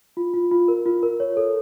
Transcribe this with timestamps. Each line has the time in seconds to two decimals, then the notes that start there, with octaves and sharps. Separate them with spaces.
0.17 F4
0.34 F4
0.51 F4
0.68 A#4
0.86 F4
1.03 A#4
1.20 C#5
1.37 A4